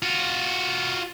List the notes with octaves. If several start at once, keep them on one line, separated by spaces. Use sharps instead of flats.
F4 F#4